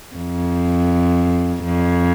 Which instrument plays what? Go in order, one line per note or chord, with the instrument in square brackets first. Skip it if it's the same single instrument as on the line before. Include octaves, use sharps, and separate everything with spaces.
[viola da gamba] F2
F2